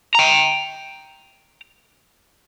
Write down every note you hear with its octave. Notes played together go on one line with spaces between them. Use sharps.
G5 A#5